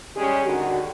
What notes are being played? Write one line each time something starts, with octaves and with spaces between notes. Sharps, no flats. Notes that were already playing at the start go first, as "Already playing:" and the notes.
G3 G#3 C#4 G4 G#4
D3 D#3 F#4